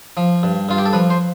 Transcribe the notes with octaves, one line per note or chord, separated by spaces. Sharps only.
F3
G2
G2 F4
G4
A4
F3 B4
C5